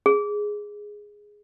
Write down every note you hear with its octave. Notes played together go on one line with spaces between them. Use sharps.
G#4